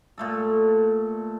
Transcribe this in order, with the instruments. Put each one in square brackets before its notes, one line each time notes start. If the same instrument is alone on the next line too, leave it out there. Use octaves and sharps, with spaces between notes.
[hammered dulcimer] A#2 A3 A4